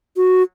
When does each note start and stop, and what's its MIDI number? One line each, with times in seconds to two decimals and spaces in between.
0.17 0.43 66